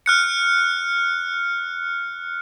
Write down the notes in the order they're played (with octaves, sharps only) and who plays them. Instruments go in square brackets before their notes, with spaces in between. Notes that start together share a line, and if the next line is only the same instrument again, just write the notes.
[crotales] F6 F#6 C#7